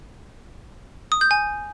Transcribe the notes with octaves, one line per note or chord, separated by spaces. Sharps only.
D#6
G6
G#5